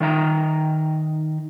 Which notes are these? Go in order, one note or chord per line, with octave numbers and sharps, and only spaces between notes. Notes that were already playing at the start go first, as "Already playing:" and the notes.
D#3 D#4 E5 G#5 A#5